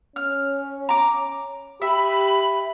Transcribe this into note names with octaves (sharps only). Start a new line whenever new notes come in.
C#4 F6
A#5 D6
G4 E5 B5